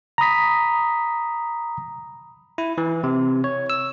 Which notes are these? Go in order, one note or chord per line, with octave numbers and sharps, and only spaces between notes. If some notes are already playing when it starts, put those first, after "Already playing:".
A#5 B5 D#6 B6
E4
E3
C3
C#5
E6